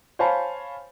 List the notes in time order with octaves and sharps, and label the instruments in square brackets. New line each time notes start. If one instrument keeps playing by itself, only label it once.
[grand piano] C5 C#5 F5 G#5 A5 B5